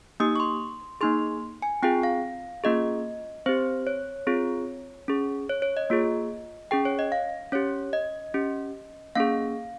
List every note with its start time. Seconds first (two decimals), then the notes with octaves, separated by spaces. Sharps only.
0.20 A#3 D#4 G4 D#6
0.36 C#6
0.40 C6
1.01 A#3 D#4 G#4 C6
1.62 G#5
1.83 C4 F4 G#4 G5
2.03 F5
2.64 A#3 C#4 F4 G#4 D#5
3.46 C4 G4 C5
3.87 C#5
4.27 C4 F4 G#4
5.08 C#4 G#4
5.49 C#5
5.62 C#5
5.77 D#5
5.90 A#3 F4 G#4
6.71 C#4 G#4 G5
6.85 C#5
6.99 D#5
7.12 F5
7.52 C#4 G4 C#5
7.93 D#5
8.34 C#4 G4
9.15 A#3 C#4 G#4 F5